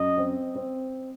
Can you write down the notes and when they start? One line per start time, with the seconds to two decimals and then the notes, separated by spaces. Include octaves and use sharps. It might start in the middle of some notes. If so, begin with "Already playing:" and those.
Already playing: F#2 D#5
0.17 C4
0.55 C4